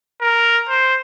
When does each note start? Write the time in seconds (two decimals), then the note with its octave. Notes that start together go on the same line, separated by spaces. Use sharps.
0.21 A#4
0.69 C5